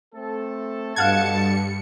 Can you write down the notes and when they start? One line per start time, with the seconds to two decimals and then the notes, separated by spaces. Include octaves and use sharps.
0.14 A3 C4 A4
0.96 G2 B2 A4 F5 F#5 A5 G#6 C#7